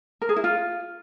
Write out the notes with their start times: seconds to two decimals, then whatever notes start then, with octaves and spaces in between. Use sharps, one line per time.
0.22 A#4
0.29 G#4
0.36 E4
0.44 F4